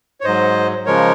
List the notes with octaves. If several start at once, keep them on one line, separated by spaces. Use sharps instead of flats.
C#5
G#2 F#3 C5 D#5
C#3 F3 G#3 A#4 C#5